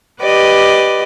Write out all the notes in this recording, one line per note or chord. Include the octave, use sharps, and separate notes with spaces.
G4 B4 D5 D#5